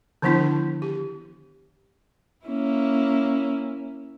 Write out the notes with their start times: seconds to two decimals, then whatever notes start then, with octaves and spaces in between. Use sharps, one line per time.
0.22 D3 D#3 F3 B3 D4 E4
0.82 G4
2.46 A#3 C#4 E4